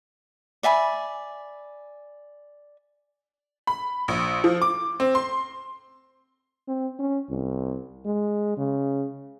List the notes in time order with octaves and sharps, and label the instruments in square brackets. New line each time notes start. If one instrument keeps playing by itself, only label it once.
[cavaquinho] D5 E5 G#5 B5
[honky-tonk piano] B5
A#1
F3
D6
C4
C6
[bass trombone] C4
C#4
C2
G#3
C#3